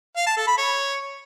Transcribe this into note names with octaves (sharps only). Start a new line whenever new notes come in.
F5
A5
A4
B5
C#5